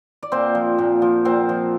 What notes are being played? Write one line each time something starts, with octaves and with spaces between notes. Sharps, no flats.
D5
A#2 C4 C5
F3
A#2
F3
A#2 C4 C5
F3